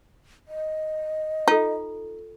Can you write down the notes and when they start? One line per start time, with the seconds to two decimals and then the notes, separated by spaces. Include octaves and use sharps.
0.48 D#5
1.48 D#4 F4 A4